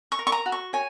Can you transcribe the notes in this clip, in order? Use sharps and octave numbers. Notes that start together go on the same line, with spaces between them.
C#6
A#4
C#6
A#5
F#4
C#6
C#5 G#5